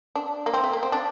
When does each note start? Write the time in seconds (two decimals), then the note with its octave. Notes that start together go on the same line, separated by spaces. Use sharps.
0.15 D4
0.46 A#3
0.54 C4
0.64 A3
0.73 A#3
0.83 C4
0.92 D4